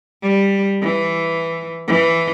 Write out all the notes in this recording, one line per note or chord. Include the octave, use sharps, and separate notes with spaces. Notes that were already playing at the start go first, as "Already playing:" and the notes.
G3
E3
E3